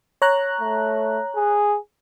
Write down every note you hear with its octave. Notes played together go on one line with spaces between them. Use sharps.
C#5 A#5 F#6
A3
G#4